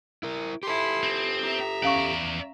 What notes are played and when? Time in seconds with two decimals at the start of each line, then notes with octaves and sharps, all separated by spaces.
0.23 E4 A#4
0.63 E4 G4 A4 C6
1.03 C4
1.43 E4 E5 A#5
1.83 E2 C#4 D5 F5 C#6